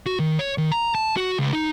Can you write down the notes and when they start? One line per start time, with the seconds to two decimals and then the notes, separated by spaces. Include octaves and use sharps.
0.06 F#4
0.19 D#3
0.39 C#5
0.58 D#3
0.72 A#5
0.95 A5
1.17 F#4
1.39 C#2
1.53 D#4